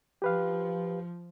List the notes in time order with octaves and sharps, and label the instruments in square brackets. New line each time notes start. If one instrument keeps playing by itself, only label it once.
[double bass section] F3 [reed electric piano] G4 B4 F5